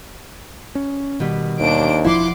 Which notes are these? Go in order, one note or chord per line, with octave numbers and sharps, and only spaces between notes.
C#4
B2 D#3 G3
D#2 D4 C5 D7
E1 F3 E4 F#5 C6 D6